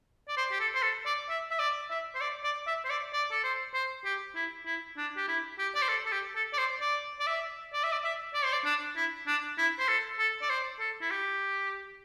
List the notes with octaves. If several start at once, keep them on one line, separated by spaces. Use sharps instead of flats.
D5
C5
G4
A4
C5
A4
D5
E5
E5
D5
E5
C5
D5
D5
E5
C5
D5
D5
A4
C5
C5
G4
E4
E4
D4
G4
E4
G4
D5
C5
A4
A4
G4
A4
D5
C5
D5
D5
E5
D5
E5
D5
E5
D5
C5
D5
D4
E4
D4
E4
C5
A4
A4
D5
C5
A4
E4
G4